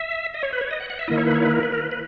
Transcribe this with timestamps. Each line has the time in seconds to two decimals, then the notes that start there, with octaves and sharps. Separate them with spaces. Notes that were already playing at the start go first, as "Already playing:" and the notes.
Already playing: E5
0.34 D#5
0.43 C#5
0.53 B4
0.61 C#5
0.71 D#5
0.80 F#5
0.90 F#5
0.99 E5
1.08 D#3 A#3 E4 D#5
1.18 C#5
1.26 B4
1.35 C#5
1.45 B4
1.54 A#4
1.63 B4
1.72 A#4
1.81 B4
1.92 B4